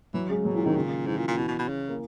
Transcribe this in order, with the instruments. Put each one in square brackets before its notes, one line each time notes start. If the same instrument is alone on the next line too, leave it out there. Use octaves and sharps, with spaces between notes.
[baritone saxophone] E3 [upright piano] F#3
[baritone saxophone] C#3 [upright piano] G#3
[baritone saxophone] B2 [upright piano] F#3
[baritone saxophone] A#2 [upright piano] E3
[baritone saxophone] G#2 [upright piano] D#3
[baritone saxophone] A#2 [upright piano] C#3
[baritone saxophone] G#2 [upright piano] E3
[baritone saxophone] A#2
A#2
[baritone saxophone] B2 [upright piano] E3
[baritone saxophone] B2
B2
C#3
[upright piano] A#3